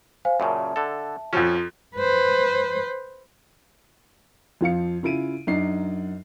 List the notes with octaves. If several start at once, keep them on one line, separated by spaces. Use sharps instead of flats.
C5 F5 G#5
F#2 A#2 C#3 E5 A5
D3 A4
F2 F3 C#4
B4 C5
F2 F3 F5 C#7
C#3 E4 F4 D7 D#7
F#2 D4 D#4 C7